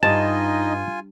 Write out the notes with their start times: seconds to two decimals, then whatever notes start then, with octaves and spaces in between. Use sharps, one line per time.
0.03 G2 D#4 F4 D#5 G#5 A5